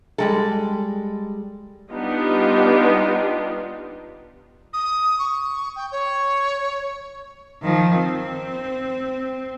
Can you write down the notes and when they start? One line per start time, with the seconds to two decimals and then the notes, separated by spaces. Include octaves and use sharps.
0.18 G3 G#3 A4
1.90 G3 B3 D4 D#4 F4 G4
4.73 D#6
5.19 C#6
5.76 G5
5.92 C#5
7.63 D#3 F3
7.95 C4